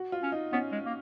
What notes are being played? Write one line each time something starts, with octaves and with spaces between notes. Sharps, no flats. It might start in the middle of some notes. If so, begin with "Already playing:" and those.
Already playing: F#4
F4
C#4
D#4
B3 C#4
G#3
A#3